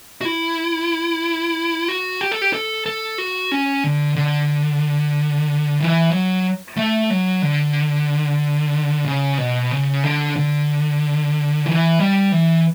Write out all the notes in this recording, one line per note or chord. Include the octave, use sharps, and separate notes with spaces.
F#4
E4
F#4
G4
A4
G4
A4
A4
F#4
C#4
D3
D3
E3
F#3
A3
F#3
D3
C#3
B2
C#3
D3
D3
E3
G3
E3